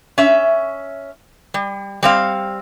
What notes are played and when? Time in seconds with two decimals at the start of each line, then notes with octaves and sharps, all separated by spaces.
0.18 C#4 E5
1.54 G3
2.03 G3 C4 F5